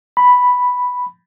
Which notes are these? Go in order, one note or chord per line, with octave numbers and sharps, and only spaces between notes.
B5